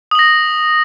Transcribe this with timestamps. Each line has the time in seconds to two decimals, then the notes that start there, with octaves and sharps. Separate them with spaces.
0.11 D#6
0.15 F#7
0.19 A#6